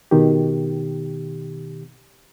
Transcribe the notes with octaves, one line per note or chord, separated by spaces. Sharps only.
B2 D#3 G4